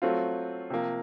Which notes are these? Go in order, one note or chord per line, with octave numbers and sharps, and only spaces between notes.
F#3 A3 C4 F4
C3 F3 A#3